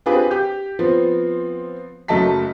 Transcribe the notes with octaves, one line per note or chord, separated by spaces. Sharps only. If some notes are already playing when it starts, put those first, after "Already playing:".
C4 D4 F4 G4 G#4 B4
G4 G6
F3 B3 C4
F#1 F#3 A3 D#5 A5 B6